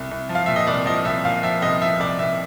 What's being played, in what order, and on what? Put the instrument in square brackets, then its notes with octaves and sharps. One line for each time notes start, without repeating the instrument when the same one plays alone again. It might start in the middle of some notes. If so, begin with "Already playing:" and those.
Already playing: [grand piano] C2
C2
F3
F5
A#2 E5
D#5
C2 D5
F3 D#5
C2 E5
A#2 F5
F3 E5
C2 D#5
F3 E5
C2 D5
C2 E5